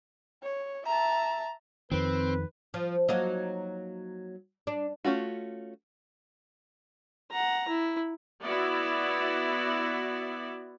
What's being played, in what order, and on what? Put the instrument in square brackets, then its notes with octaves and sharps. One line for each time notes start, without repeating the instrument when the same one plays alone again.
[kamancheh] C#5
[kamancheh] E5 A5 [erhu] A#5
[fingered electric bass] F2 D#3 [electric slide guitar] C4 [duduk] B4
[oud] F3
F#3 A#3 D#4
D4
[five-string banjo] A3 C#4 F4 F#4
[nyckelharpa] F#5 A#5
E4
[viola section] B3 E4 F#4 D5